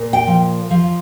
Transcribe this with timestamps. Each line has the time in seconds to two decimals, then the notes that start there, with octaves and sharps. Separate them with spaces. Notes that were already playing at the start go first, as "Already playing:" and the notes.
Already playing: A#2
0.13 G5
0.27 F3
0.71 F3